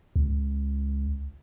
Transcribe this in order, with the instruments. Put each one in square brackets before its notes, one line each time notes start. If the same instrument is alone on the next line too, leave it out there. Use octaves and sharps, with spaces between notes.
[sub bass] C#2